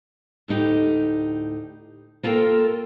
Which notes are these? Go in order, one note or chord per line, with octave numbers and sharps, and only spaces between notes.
D2 A2 D#4 G4
A#3 F4 A4 A#4 G5